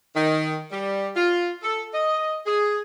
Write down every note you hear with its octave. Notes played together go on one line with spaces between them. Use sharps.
D#3
G3
F4
A4
D#5
G#4